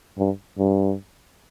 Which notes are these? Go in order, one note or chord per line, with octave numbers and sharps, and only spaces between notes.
G2
G2